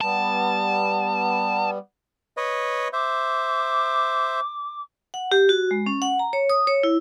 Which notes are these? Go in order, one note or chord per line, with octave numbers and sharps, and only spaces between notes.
G3 B3 A5
B4 C#5 D#5
C5 E5 D6
F#5
G4
F#4
G#3
C#4
F#5
A#5
C#5
D#6
C#5
E4